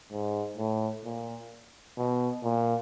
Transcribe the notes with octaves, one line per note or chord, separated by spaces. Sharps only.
G#2
A2
A#2
B2
A#2